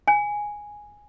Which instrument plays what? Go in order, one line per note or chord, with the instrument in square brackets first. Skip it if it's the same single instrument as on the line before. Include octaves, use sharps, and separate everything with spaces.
[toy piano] G#5